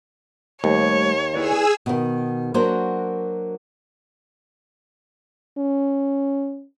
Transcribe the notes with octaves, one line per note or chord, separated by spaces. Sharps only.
D#2 G3 A3 C5 C#5
E4 G#4 B4 D5 G#5 E6
B2 D#3
F#3 A#3 D4 F#4 A#4 C5
C#4